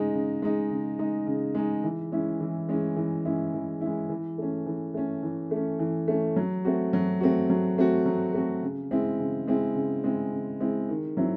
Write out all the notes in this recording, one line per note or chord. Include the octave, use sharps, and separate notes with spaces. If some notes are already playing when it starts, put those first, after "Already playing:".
Already playing: C#3 G#3 D#4
C#3
G#3 D#4
C#3
G#3 D#4
C#3
G#3 D#4
E3
G#3 C#4 E4
E3
G#3 C#4 E4
E3
G#3 C#4 E4
E3
G#3 C#4 E4
E3
A3 C#4
E3
A3 C#4
E3
A3 C#4
E3
A3 C#4
F#3
A3 C4 F#4
F#3
A3 C4 F#4
F#3
A3 C4 F#4
F#3
A3 C4 F#4
C#3
G#3 C4 E4
C#3
G#3 C4 E4
C#3
G#3 C4 E4
C#3
G#3 C4 E4
D#3
F#3 C4 E4